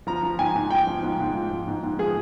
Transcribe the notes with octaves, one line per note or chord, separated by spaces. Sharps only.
F3 A#5
F3
G#2 G#5
G#2
F3 G5
F3
G#2
G#2
F3
F3
G#2
G#2
F3 G#4